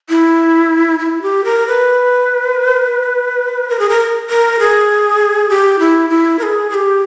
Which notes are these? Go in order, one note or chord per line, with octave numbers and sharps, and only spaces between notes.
E4
E4
G4
A#4
B4
A#4
G#4
A#4
A#4
G#4
G4
E4
E4
A#4
G#4
G#4
G4